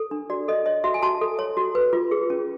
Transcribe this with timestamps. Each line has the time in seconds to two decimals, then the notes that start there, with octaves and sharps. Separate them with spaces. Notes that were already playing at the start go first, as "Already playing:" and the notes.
Already playing: A4
0.11 D4
0.30 F#4 D5
0.48 A4 D#5
0.66 C#5 D#5
0.84 F#4 E5
0.94 G#5
1.02 F#4 A5
1.21 A4
1.39 C#5
1.57 F#4
1.75 B4
1.93 F4
2.11 G#4
2.30 C#4